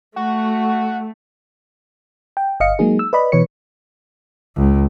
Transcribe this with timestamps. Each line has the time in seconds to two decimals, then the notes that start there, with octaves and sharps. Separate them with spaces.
0.16 A3 F#4
2.37 G5
2.60 G1 D#5 F5 C#7
2.79 F#3 G#3 A#3 D#4 G#4
2.99 E6
3.13 B4 D5 D#5 B5
3.32 B2 E3 B4 C#5 C#7
4.57 C#2